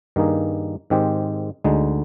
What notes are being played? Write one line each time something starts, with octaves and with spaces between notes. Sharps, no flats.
G2 D#3 A#3 D#4 G#4
G#2 D#3 G#3 C4 G4
D2 D3 G#3 D#4